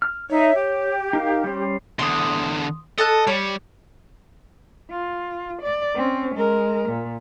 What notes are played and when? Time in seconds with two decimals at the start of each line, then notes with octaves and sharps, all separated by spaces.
0.02 F6
0.30 D#4 C#5 E5
0.56 G4
1.13 D#4 A#4 F5
1.44 G3 C#4 C5
1.99 E2 D3 C6 D#6
2.98 A4 D#5 A5 F#6
3.27 G3 C#5
4.91 F4
5.62 D5
5.95 C4 C#4
6.35 G#3 A#4
6.89 A#2